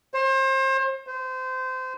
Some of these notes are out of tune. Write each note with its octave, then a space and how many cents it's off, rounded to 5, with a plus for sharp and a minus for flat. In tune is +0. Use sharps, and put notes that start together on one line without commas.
C5 +35
C5 -25